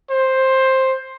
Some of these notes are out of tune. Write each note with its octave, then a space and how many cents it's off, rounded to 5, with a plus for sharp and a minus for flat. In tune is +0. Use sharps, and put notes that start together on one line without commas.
C5 +10